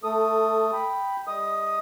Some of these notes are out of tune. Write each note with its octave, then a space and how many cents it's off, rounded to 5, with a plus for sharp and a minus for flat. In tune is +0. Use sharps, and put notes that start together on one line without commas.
A3 +0 A4 +20 D#6 +0
G5 +0 B5 +0
G3 +25 D#5 +30 D#6 +0